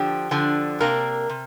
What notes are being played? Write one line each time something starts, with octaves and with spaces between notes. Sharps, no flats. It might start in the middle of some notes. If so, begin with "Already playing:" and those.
Already playing: D3 F3 D4 G4
D3 F3 D4
C3 A#3 D4 A#4
C3